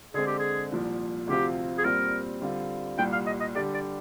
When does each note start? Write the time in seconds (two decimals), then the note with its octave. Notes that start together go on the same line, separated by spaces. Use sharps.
0.14 D3 G#3 C4 G#4
0.27 G4
0.39 G#4
0.72 C2 A#2 F3
1.27 D2 C3 F3 C4 F4 G4
1.78 G#4
1.84 A#2 G3 C4 A#4
2.41 D3 G3 C4 F4
2.98 C2 A#2 G3 G5
3.13 F5
3.26 D#5
3.40 D#5
3.55 D3 G3 D4 G4 D5
3.74 D5